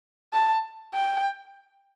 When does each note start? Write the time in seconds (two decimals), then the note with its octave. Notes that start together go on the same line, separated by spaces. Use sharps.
0.33 A5
0.94 G5